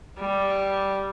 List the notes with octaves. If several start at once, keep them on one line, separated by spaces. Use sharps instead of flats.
G3